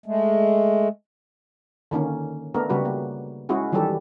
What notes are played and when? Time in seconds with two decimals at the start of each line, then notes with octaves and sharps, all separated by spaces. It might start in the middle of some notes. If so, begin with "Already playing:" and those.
0.06 G#3 A3
1.91 D3 D#3 A#3 C#4
2.54 A3 B3 D4 A4 A#4
2.70 C#3 G3 F#4 B4
2.85 A#3
3.49 G#3 C#4 E4 F#4 G#4
3.72 D#3 E3 F#3 G3 G4 A4